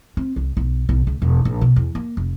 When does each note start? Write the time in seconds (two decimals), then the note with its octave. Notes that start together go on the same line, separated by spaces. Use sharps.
0.17 C4
0.36 C2
0.57 B1
0.89 B1
1.07 C#2
1.22 E1
1.45 A#1
1.61 B2
1.76 E2
1.95 A#3
2.17 F1